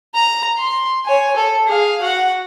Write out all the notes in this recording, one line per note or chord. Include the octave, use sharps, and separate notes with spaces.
A#5
C6
C#5 G#5
A4
G#4 F5
F#4 F#5